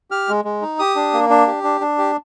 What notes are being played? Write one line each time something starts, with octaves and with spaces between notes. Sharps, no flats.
G4 F6
G#3
G#3
D#4
G4 D#6
D4
A#3
D4
G4
D4
D4
G4